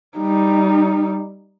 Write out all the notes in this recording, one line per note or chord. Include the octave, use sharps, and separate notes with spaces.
G3 D#4